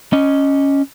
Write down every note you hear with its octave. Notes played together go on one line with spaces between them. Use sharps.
C#4 D#5